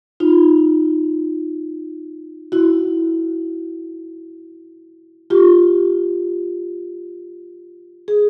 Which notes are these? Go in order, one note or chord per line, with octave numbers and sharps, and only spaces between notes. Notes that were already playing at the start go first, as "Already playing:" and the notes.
D#4 F4
E4 F#4
F4 G4
G#4